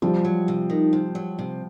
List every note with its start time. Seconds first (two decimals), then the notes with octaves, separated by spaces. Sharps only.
0.02 C3 F3 G3
0.25 F#3
0.48 C3
0.70 D#3
0.93 C3
1.15 F#3
1.39 C3